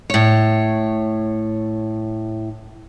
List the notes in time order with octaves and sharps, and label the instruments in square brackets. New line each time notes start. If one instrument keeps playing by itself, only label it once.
[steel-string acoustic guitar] A2 C#5